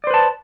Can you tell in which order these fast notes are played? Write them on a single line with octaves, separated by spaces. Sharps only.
D5 C5 B4 A5